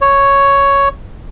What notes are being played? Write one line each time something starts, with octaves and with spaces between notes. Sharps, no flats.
C#5